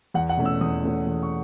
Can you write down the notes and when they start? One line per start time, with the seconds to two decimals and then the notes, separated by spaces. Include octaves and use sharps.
0.14 E2 F#5
0.29 F#5
0.37 B2 A3 C#4
0.45 E6
0.61 E2 D#6
0.84 B2 A3 C#4
1.07 E2
1.23 C#6